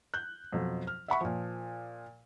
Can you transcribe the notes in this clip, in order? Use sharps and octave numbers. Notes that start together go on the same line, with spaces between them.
F#6 G6
F2 B2 F#3
F6
E5 F#5 B5 C#6
A#2 F3